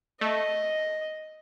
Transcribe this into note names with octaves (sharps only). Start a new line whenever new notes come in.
A3 D#5